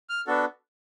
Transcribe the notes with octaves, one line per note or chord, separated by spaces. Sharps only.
F6
B3 D4 F#4 A4